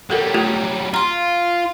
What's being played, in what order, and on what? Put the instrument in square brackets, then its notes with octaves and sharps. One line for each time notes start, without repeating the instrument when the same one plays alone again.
[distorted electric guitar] F#3 G3 [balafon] G4 A4 A#4
[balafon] A3 F4 G4
[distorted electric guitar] F4 [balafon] A#5 C6